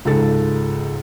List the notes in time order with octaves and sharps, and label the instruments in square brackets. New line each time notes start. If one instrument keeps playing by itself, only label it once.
[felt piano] C#2 G#2 A4 A6